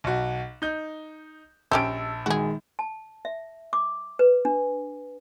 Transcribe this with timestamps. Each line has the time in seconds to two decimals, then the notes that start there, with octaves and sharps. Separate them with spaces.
0.04 B1 F#4
0.62 D#4 G6
1.71 A#1 C#4 G4 C5 A5 E6 D7
2.26 D#3 G#3 F#4 G#4
2.79 A5
3.25 E5
3.73 D6
4.19 B4
4.45 D4